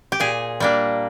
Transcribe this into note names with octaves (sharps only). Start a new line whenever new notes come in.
G4
A#2 G#4
G3 A#3 D4